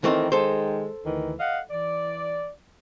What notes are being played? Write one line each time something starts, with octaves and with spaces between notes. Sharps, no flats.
D#3 E3 A3 C4
D#3 G#3 A4 C5
D2 D#3 E3
D#5 F5 F#5
E3 D5